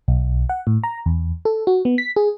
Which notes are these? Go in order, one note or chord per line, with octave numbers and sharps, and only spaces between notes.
B1
F#5
A2
A#5
E2
A4
F#4
B3
B6
G#4